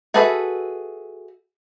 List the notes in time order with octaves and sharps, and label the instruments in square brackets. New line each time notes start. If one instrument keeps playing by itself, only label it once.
[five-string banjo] F#4 G#4 A4 B4 E5